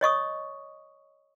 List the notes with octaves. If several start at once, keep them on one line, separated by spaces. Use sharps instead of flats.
C#5 D#5 C#6 D#6